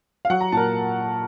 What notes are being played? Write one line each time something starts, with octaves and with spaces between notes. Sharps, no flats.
F5
F#3 F#5
A#5
A#2 A#4 A5